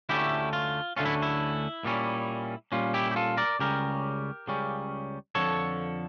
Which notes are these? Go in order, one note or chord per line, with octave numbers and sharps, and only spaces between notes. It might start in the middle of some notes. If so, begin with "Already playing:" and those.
D2 D3 A3 C#4 E4 G4
F4
D2 D3 A3 C#4 F4
E4
E4
A#2 G3 C#4
A#2 G3 C#4 F4
E4 G4
G4
F4 A4
A#4 D5
C#2 C#3 G3 C#4 G4 A#4
C#2 C#3 G3 C#4
F2 D3 F3 A4 C#5